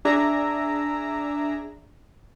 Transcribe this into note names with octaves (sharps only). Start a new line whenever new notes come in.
D4 G#4 D5 E5 A#5